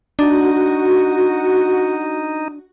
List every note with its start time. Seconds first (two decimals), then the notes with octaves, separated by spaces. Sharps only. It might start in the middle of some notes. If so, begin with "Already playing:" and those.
0.19 D4 D#4 F#4